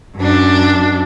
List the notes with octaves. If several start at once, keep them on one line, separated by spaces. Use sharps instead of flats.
F#2 D4